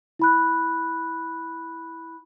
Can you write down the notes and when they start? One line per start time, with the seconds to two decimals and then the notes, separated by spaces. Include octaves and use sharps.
0.19 E4 B5 F#6